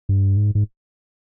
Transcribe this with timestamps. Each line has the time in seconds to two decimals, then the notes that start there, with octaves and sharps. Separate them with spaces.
0.09 G2
0.37 G#2
0.55 G#2